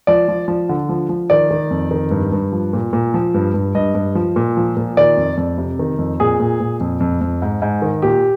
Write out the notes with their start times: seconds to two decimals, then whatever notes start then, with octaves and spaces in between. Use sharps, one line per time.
0.07 F3 D5
0.28 F3
0.48 F3
0.69 D3
0.89 F3
1.09 F3
1.30 D#3 D5
1.50 D#3
1.71 F2
1.91 D#3
2.11 G2
2.32 G2
2.52 F3
2.73 A#2
2.93 A#2
3.14 F3
3.34 G2
3.54 G2
3.75 G2 D#5
3.95 G2
4.15 F3
4.36 A#2
4.57 F3
4.77 A#2
4.97 D#3 D5
5.17 F2
5.37 F2
5.58 C3
5.79 D#3
5.98 F2
6.20 A#2 G#4
6.40 A#2
6.60 A#2
6.80 F2
7.00 F2
7.21 F2
7.42 G#2
7.62 G#2
7.82 D#3
8.02 A#2 G4